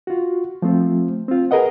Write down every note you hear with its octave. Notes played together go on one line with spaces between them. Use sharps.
F4 F#4
F3 A3 C4 F4
C4 F4
G#4 A#4 B4 D#5 F#5